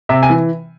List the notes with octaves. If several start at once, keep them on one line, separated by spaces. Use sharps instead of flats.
C3 E5
G#5
E3